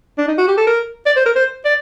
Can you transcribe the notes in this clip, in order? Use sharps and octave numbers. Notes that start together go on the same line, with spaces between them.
D4
D#4
F#4
G4
A4
A#4
D5
C5
A#4
C5
D5